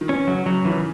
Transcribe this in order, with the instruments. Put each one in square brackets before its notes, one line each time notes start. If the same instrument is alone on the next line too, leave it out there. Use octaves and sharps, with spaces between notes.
[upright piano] D#3
[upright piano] E3 [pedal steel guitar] C#4
[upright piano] C#3 [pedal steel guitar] F#3
[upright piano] C#3 [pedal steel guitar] F#3
[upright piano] D#3 [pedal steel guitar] E3